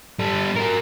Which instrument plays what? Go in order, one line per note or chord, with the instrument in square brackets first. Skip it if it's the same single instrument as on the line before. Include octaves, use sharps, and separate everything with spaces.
[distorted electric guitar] G3 A4
F#4 A#4